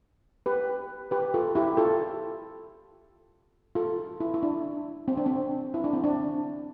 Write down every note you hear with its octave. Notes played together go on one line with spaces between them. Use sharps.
G4 B4
G4 B4
F4 A4
E4 G4
F4 A4
F4 A4
E4
E4
D4
C4
D4
C4
E4
D4
C4
D4